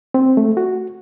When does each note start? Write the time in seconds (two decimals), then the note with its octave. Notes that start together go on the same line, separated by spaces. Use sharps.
0.14 C4
0.37 A3
0.57 F#4